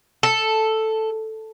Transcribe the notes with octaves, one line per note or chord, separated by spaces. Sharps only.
A4